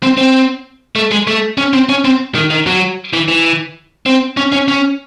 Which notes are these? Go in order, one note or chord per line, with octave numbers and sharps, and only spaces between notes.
C4
C4
A3
G#3
A3
C#4
C4
C#4
C4
D#3
D#3
F#3
E3
E3
C4
C#4
C#4
C#4